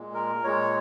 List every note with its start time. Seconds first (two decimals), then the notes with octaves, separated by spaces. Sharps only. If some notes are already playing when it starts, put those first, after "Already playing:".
Already playing: A#2 G#3
0.14 A#4
0.44 A#2 G#3 C#5